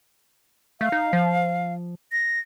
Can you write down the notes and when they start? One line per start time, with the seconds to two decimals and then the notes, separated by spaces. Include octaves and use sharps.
0.81 A3 F5
0.92 D#4
1.13 F3
2.12 A#6